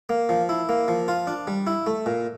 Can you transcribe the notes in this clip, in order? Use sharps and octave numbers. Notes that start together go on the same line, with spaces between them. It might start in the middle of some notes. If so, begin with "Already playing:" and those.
A#3
F3
E4
A#3
F3
F4
D4
G3
E4
A3
A#2